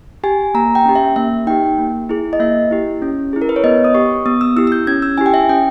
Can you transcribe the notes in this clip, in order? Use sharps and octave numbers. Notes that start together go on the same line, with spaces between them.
G4 G#5
A#3 A#5
G5
C#4 G4
E5
A#3 E5
D#4 G4 G5
A#3
E4 G#4
D#5
A#3 E5
E4 G4
C#4
E4 G#4
A#4
B4
C#5
B3 D#5
D#6
G4 C#6
B3 D#6
E6
E4 G4 E6
E6
G6
C#4 G#6
E6
E4 G4 G#5
G5
E5
C#4 G5